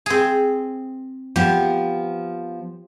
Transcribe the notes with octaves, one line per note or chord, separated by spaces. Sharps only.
C4 G#4
F3 B3 G4